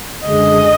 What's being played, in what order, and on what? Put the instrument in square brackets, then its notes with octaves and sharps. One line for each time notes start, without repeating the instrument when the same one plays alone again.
[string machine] F#2 D3 G#3 D4 G#4 [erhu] D#5